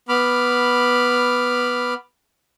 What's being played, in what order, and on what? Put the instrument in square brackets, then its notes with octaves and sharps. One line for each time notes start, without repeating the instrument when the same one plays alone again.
[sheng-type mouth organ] B3 B5 D6 F6